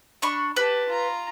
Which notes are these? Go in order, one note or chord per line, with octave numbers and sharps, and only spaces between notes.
D4 B5 C#6
G4 B4 A5
F4 A#5